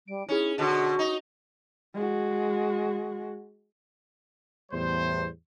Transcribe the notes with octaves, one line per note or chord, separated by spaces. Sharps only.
G3 D7
C#4 D#4 E4 G#4
B2 D3 F#4
D#4
G#3 F#4
E2 A2 G3 C5